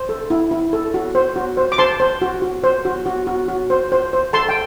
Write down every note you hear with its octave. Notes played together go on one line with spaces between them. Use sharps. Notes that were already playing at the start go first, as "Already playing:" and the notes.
Already playing: C5
A4
E4
E4
A4
F#4
C5
F#4
C5
D6
C5 A5 C6
C5
F#4
F#4
C5
F#4
F#4
F#4
F#4
C5
C5
C5
A4 A5 C6
G5